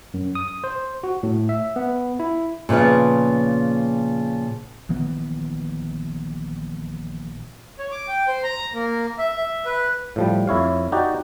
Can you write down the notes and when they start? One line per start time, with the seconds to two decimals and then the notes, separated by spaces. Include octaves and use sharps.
0.14 F#2
0.35 D#6
0.64 C5
1.03 F#4
1.23 A2
1.49 E5
1.76 B3
2.20 E4
2.69 A#2 C#3 F3 B3 F4
4.89 A#1 D#3 E3 B3
7.79 C#5
7.91 D6
8.08 G5
8.28 C5
8.43 A#5
8.74 A#3
9.18 E5
9.37 E5
9.66 B4
10.16 A2 F3 G3
10.47 F2 E4 C#5 F5
10.92 D#4 F#4 G4 D5